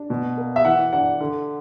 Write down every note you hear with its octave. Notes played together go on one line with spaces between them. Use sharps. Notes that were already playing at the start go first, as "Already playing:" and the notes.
Already playing: D4
B2
A#3
E5
E3 F#5
D4 F#5
D3